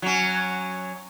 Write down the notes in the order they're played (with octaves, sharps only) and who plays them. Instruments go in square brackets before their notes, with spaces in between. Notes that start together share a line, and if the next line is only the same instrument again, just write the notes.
[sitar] F#3 C#4